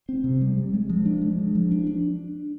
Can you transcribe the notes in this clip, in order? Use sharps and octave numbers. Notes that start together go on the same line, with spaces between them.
C4
C3
G3
G3
G#3
F3
D4
G#3
F3
F3
D4
D4